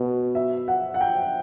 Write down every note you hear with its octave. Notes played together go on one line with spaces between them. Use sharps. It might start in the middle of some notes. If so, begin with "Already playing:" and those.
Already playing: B2
E5
F#5
F#5
G5